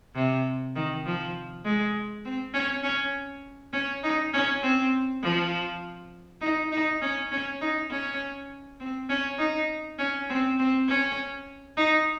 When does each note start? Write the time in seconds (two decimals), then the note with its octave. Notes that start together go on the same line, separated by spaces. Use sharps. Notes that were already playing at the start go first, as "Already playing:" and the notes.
0.15 C3
0.76 D#3
1.06 F3
1.64 G#3
2.25 C4
2.54 C#4
2.83 C#4
3.73 C#4
4.03 D#4
4.33 C#4
4.62 C4
5.22 F3
6.41 D#4
6.72 D#4
7.02 C#4
7.31 C#4
7.61 D#4
7.90 C#4
8.80 C4
9.09 C#4
9.39 D#4
9.99 C#4
10.29 C4
10.59 C4
10.88 C#4
11.77 D#4